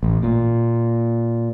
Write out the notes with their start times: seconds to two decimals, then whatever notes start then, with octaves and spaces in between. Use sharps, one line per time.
0.03 A1
0.23 A#2